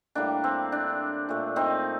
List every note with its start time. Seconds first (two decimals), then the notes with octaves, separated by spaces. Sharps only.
0.15 A2 G3 A#3 D4
0.44 C4
0.72 D4
1.29 A#2 A3
1.56 C4 D#4